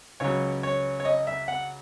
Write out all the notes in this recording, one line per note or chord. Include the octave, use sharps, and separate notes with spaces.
C#2 C#3 F#3 C#5
C#5
C#5
D#5
E5
F#5